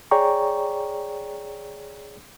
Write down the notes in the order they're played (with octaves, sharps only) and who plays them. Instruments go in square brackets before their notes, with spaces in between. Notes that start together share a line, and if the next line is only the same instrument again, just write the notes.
[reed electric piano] G#4 C#5 D5 G5 A#5 C#6